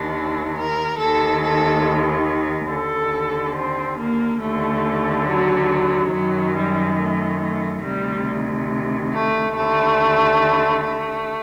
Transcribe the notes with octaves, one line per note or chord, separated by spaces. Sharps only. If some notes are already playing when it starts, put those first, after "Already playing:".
Already playing: D#2 D#3 D4
A#4
D#2 D#3 A4
A4
D#2 D3 A4
C4
A#3
D#2 D3 A3
F#3
F#2 D#3 F#3
G3
A3
A3
D2 C3 D#3 G3
A3
D#2 D3 A3
A3